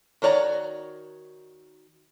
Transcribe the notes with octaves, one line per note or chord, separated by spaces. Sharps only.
D#3 F#4 C#5 D5 A#5